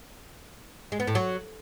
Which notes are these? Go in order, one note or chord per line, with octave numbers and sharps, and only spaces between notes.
G#3
B3
A2
F#3